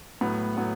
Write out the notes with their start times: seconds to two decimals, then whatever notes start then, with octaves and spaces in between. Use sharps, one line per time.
0.21 A2 F#3 B3
0.57 A2 F#3 B3